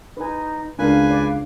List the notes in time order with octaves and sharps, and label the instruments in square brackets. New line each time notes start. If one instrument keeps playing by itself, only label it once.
[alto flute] D#4 [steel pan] B4 G#5
[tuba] C#2 [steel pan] D4 A#4 [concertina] B4 G#5 [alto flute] F5
[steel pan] D5